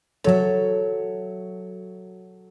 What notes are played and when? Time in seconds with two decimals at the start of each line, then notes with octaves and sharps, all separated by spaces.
0.24 F#3 A4 C#5 E5